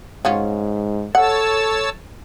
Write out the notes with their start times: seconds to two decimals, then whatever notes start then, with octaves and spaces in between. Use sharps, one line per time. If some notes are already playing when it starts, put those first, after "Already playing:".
0.25 G#2 C#4 F4 F#4
1.15 A4 C#5 F#5 A5 E6